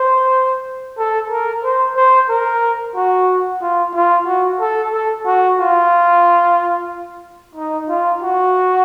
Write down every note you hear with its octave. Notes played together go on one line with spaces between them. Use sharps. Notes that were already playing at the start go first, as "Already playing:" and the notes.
Already playing: C5
A4
A#4
C5
C5
A#4
F#4
F4
F4
F#4
A4
A4
F#4
F4
D#4
F4
F#4